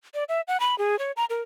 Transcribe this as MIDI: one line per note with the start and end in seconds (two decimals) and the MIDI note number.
0.14 0.24 74
0.29 0.41 76
0.48 0.59 78
0.60 0.77 83
0.78 0.98 68
0.99 1.12 73
1.17 1.25 82
1.30 1.42 70